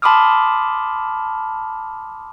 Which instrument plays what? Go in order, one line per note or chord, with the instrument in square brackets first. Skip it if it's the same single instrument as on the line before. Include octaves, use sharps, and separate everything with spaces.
[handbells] A5 B5 C6 D6 D#6 F6